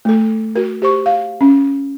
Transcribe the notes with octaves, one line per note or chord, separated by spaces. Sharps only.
A3 A4
F#4 A#4
G4 C5 C#6
F5
C#4